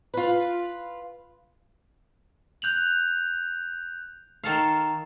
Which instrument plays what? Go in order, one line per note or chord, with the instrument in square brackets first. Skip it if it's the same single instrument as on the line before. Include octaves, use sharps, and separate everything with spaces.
[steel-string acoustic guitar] F4 B4
[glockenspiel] F#6 G6 F7 F#7
[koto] D#3 A4 F5